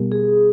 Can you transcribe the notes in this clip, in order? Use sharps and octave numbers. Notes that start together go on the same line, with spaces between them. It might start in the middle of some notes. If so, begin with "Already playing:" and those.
Already playing: B2 G3 B3 G4 A#4
G#4